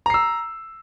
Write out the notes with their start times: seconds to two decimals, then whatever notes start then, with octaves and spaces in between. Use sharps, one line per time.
0.06 A#5
0.10 C7
0.14 E6